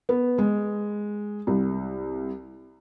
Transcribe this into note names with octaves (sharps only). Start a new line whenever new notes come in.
B3
G#3
C2